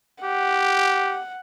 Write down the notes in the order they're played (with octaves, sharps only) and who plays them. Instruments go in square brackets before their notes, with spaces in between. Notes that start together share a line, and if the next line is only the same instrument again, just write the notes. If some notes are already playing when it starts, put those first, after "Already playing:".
[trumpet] G4 [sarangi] F#5